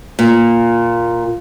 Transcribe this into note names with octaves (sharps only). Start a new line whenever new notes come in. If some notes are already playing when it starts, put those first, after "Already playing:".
A#2